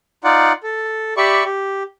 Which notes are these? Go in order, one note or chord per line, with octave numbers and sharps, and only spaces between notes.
D#4 F4 D5 F#5
A4
G4 D5 E5 B5 C#6
G4